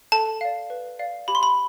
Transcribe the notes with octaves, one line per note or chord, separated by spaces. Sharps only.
A4 A5
D5 F5
B4
D5 F5
G4 B5
C6
B5